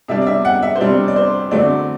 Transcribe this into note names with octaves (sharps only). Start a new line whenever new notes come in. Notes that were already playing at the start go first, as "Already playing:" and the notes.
C3 G3 D4 E5
D5
E5
F#5
E5
C5
C3 G3 D4 D5
D5
C5
D3 F#3 A3 C4 D5